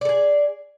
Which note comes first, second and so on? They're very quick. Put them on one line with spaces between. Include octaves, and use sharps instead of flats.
D5 A4 G#4